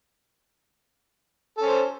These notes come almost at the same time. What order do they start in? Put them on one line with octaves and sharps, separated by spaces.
A4 C#4 C5